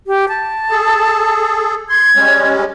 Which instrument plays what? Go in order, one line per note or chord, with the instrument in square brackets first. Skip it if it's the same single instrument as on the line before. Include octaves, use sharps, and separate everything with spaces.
[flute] G4
A5
[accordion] G#4 A4
[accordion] C6 [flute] G#6
[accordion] G3 G#3 C#4